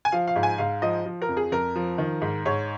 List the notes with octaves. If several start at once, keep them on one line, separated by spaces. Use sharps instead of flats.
G#5
F3 F5
F5
G#2
G#5
G#2 F5
F3 D#5
F3
A#4
F2
G#4
F2 A#4
F3
D#3
G#2
G#2 C#5